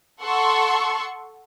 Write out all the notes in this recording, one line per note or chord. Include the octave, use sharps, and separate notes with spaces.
A4 F#5 C6 C#6